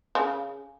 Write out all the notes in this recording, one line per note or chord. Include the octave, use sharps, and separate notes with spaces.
C#3